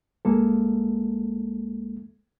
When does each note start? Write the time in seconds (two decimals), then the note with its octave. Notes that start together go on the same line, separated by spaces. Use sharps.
0.25 C2 G#3 A#3 A4